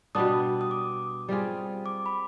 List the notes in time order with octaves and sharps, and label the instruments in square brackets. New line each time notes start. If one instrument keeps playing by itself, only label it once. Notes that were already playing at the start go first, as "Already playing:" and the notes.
[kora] B2 G3 B3 D4 [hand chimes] D#6
[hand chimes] D#6
D6
[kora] G3 C4 F4 G#4
[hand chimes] D6
B5